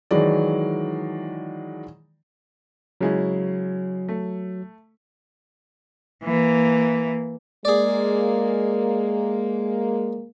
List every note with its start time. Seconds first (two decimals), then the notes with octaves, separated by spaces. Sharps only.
0.11 D#3 E3 F#3 G#3 D5
3.01 C#3 F#3 G#3 E4
4.09 A3
6.24 E3 A#3
7.65 G#3 A#3 G#4 D5